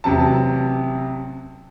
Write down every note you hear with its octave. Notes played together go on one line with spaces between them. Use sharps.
A1 C3 F#3 A5